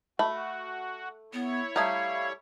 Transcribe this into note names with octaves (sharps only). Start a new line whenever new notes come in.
A3 F#4 B5
B3 E4 C#5
G3 A3 F5 A#5 D#6 G#6